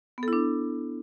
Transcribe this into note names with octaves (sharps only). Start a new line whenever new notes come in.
B3 D4 E4 A4